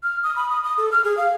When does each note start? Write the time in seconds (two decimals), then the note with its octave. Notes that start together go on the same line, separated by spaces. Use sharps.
0.03 F6
0.23 D#6
0.36 B5
0.50 D#6
0.64 D#6
0.78 A4
0.92 F6
1.04 G#4
1.17 F5